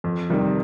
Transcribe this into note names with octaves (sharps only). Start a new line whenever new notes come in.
F2
C3 D#3 G3